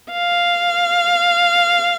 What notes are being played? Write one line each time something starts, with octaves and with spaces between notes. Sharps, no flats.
F5